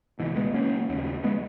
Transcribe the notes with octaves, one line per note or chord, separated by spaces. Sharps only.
C#2 B2 E3
G#3 B3
A#3 C#4
D#2 C#3
G#3 B3